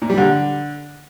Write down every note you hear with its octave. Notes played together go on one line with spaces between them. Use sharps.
A#2
G3
D3